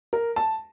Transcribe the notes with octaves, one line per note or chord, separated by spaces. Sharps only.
A#4
A5